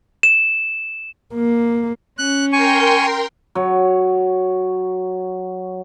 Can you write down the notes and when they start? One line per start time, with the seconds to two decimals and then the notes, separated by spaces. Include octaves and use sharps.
0.23 E7
1.34 A#3
2.18 C#4 F#6
2.52 A#4 G5 G#5 C6 C#6
3.55 F#3 C#5